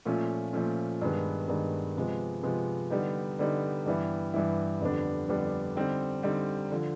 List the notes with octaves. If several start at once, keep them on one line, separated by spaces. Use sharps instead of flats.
A#2 F3 A3 C#4
A#2 F3 A3 C#4
G2 D#3 G#3 B3
G2 D#3 G#3 B3
C3 F3 G#3 B3
C3 F3 G#3 B3
D3 G3 B3 D#4
D3 G3 B3 D#4
G2 E3 G3 B3 E4
G2 E3 G3 B3 E4
F2 D3 G3 B3 D4
F2 D3 G3 B3 D4
D3 G3 C4 D#4
D3 G3 C4 D#4
D3 F3